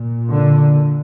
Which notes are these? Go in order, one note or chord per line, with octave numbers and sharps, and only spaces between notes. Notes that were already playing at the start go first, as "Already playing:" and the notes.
Already playing: A#2
D3